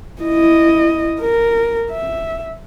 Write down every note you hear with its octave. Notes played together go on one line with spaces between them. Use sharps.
E4 D#5
A#4
E5